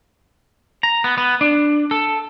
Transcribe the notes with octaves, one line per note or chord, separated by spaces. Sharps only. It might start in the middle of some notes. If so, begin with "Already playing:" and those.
A#5
B3
B3
D4
A4